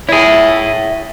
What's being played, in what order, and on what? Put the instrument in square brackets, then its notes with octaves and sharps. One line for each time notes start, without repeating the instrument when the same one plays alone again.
[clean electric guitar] E4 G#4 [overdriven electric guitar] C#5 E5